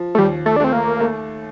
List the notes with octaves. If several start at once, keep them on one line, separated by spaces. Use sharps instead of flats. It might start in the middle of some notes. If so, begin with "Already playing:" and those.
Already playing: F3
A3
D#2 G3
A3
D4
A3 C4
A#3
A3